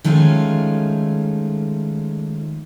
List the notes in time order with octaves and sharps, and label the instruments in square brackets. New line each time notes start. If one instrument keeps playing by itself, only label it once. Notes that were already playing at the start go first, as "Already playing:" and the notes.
[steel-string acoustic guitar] D#3 F3 G#3 A3 C#4 F4